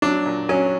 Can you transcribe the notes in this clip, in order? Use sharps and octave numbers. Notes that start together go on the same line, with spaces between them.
F#3 D4
A#2
F#3 C#4